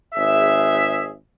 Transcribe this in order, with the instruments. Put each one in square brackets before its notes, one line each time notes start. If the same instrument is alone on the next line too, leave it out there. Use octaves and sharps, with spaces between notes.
[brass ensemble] G#1 G#4 E5